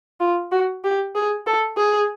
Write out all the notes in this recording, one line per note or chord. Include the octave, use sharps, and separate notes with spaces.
F4
F#4
G4
G#4
A4
G#4